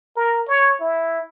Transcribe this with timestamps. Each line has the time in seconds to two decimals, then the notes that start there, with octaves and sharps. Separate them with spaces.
0.16 A#4
0.48 C#5
0.80 E4